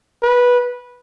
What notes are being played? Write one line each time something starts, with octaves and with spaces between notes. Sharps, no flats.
B4